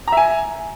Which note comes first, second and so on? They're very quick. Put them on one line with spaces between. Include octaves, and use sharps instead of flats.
A#5 E5 G#5